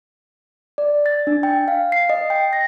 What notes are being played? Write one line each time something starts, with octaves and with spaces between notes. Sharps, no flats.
D5
A6
D4
G5
F5
C7
D#5
G5
A#6